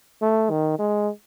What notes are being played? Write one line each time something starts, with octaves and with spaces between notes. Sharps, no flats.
A3
D#3
G#3